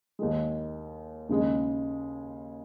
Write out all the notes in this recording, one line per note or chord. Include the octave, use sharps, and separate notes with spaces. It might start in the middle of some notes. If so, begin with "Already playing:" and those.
D#2 D#3 G#3
D#2 C#3 G#3